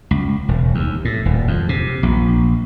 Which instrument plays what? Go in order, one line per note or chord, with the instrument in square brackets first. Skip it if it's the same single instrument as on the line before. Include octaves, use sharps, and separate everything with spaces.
[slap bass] C#2
E1
D#2
A2
D#1
F2
C3
A#1